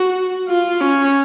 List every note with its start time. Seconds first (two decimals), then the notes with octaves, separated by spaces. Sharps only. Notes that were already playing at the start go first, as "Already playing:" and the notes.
Already playing: F#4
0.48 F4
0.81 C#4